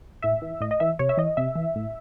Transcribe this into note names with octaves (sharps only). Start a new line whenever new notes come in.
A2 E5
E3
A2 D#5
D#5
E3 E5
C3 C#5
E5
E3 D#5
C3 E5
E3
A2